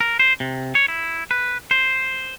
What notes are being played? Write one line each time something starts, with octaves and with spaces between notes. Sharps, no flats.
A#4
C5
C3
C#5
E4
B4
C5